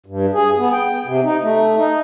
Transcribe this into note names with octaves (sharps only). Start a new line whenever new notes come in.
G2
G#4
B3
G5
C3
D#4
A3
D#4